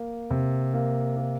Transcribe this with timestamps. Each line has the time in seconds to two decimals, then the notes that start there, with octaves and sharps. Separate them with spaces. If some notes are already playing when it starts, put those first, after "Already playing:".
Already playing: A#3
0.30 C3
0.74 A#3
1.17 A#3